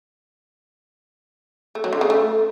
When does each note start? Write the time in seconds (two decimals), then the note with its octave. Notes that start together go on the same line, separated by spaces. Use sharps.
1.75 A3
1.84 F#3
1.93 D3
2.01 C#3
2.10 A3